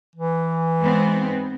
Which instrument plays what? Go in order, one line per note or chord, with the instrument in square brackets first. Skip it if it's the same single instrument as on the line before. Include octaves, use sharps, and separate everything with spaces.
[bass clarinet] E3
[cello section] G#2 B3 C4